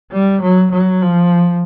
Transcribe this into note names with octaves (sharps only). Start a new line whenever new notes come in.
G3
F#3
F#3
F3